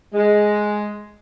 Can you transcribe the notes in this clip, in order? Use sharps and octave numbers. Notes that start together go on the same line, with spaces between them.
G#3